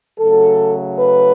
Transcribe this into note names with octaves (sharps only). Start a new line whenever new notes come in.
C#3 F#3 A3 A4
B4